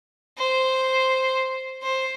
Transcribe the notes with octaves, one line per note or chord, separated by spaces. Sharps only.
C5
C5